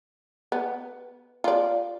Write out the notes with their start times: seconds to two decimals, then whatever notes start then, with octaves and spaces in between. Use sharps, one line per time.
0.52 B3
1.44 F4 D5